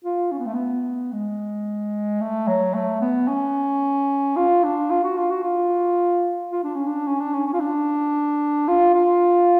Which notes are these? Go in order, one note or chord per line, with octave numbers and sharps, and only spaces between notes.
F4
C#4
B3
A3
B3
G#3
A3
F#3
A3
B3
C#4
F4
D4
F4
F#4
F4
F#4
F4
F4
D4
C#4
D4
C#4
D4
C#4
C#4
F4
D4
F4
F4